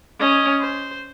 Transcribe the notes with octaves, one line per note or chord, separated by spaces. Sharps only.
C#4 D#5
C5